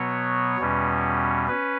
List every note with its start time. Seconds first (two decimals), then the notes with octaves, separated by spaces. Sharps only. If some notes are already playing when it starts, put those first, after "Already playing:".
Already playing: B2 F#3 B3 C#5
0.58 E2 B2 G3 C#4
1.48 C#4 B4